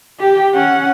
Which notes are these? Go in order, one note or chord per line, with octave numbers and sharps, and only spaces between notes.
G4 G5
C#4 F#5